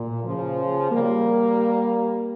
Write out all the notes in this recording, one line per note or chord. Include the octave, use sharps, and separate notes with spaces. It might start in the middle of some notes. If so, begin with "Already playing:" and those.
Already playing: A#2
C#3 F3
G3 A#3